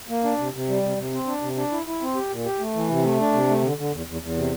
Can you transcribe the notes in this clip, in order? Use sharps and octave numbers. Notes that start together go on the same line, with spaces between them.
A#3
D4
C3
C3
G3
C3
C3
C4
D4
C3
D4
E4
E4
C4
G4
A#2
G4
A3
E3
C3
A3
D4
C3
A3
D3
D3
E2
E2
E2
C3